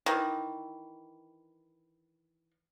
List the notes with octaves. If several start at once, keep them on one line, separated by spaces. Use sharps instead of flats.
D#3 E3